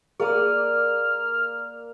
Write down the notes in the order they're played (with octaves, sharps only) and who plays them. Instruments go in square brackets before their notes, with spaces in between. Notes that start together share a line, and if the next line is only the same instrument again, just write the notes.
[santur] A#3 D#6 [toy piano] G#4 [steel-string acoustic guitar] D5 [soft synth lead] F6